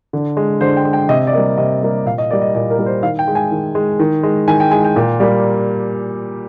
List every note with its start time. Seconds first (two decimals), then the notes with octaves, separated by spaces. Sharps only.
0.13 D3
0.37 G#3
0.61 D3 C5
0.77 G5
0.85 G#3
0.93 G5
1.09 C3 D#5
1.27 D5
1.33 G3 A#3 D#5
1.57 C3 D#5
1.83 G3 A#3
2.05 A#2 F5
2.18 D#5
2.31 G3 A#3 D5
2.42 D#5
2.54 A#2 D5
2.70 A#4
2.78 G3 A#3
2.86 C5
3.03 D#3 F5
3.19 G5
3.28 G#3
3.35 G#5
3.51 D#3
3.75 G#3
4.00 D#3
4.23 G#3
4.48 D#3 G#5
4.60 G5
4.71 G#3 G#5
4.85 G5
4.96 A#2
5.20 G3 A#3